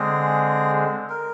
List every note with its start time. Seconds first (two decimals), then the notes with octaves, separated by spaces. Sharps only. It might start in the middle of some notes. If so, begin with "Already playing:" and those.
Already playing: D3 G#3 C4 G#4
1.10 A#4